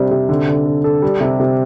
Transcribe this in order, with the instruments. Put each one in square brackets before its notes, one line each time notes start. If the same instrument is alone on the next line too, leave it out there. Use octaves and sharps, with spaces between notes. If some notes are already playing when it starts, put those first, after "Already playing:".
Already playing: [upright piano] C3 G3 C4 D4
C3
D3
D3
A4
A4
G3
C3
C3